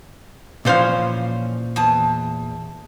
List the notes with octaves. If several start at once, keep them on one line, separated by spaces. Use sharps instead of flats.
A#2 E3 F3 C#4 C5 F5
E2 A5